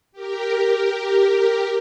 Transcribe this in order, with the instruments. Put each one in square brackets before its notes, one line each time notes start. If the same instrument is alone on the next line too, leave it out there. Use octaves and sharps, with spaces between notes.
[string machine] G4 A#4